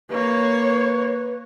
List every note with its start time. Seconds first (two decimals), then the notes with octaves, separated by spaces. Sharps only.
0.10 A#3 B4 C#5